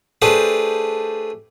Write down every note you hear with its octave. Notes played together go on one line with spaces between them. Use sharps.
A3 D4 G4 G#4 B4 C5